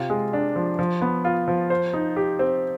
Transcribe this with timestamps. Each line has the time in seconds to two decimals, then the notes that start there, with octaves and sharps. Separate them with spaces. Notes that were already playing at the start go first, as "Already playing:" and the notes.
Already playing: C3 F4
0.10 G#3
0.33 D4
0.56 F3
0.79 F3
1.02 B3
1.25 F4
1.48 F3
1.70 C5
1.93 D#4
2.16 G4
2.39 C4